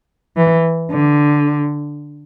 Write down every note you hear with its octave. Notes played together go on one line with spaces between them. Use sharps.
E3
D3